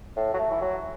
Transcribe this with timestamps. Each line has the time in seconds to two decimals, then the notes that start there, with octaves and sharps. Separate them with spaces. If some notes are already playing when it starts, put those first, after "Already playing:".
0.16 A2
0.34 F#3
0.39 A3
0.52 E3
0.61 F#3